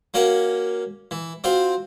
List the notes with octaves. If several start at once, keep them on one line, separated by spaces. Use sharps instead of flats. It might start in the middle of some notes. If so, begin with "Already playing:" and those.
A#3 C#4 F#4 A#4 F#5
E3
C4 F4 F#4 C5